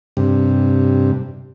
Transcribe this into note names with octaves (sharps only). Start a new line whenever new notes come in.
G2 C3